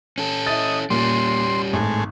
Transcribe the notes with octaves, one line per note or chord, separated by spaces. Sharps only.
C#4 A4
E4 D#5 A6
A#2 G3 C#4 C6
G#1 A2 G#3